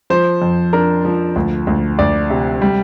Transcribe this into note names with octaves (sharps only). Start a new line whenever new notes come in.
F3 C5
F2
D4 A#4
F3
D2
D2
D2 D5
C3
G3